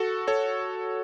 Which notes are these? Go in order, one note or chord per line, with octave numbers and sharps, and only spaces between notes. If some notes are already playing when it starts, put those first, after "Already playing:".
Already playing: F#4 A4
A4 C#5